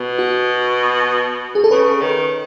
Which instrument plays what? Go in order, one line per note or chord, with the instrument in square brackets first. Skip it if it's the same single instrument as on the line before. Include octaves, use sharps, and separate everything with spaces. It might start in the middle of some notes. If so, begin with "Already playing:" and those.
Already playing: [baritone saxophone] B2
[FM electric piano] F#4
G#4
A4
[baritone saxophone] C#3 [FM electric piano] B4
[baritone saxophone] D#3